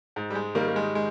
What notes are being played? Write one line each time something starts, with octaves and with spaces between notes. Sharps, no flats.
G#2
G3
G#3
D#3 G3 A#3
A#3
G#3
G#3